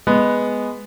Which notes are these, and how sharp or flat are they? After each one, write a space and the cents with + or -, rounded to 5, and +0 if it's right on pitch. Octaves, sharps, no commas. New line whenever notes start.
G#3 +0 B3 +0